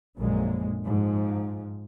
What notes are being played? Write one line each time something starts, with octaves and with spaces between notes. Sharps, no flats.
A#1 F#2 A#2 D3 G#3 A#3
G#2 F3